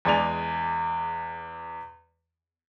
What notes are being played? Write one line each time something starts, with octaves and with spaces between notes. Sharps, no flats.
E2 G#3 D5 G#5 F7